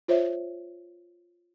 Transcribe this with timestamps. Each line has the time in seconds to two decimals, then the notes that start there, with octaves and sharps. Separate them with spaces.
0.08 F4 C5 C#5 E5